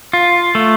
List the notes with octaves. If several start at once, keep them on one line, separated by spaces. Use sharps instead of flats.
F4
A3